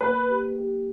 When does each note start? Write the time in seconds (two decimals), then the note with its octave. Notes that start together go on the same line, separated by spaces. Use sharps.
0.01 A#3 B4
0.28 G4
0.56 G4